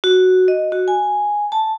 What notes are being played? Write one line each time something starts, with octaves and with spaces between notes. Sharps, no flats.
F#4
D#5
F#4
G#5
A5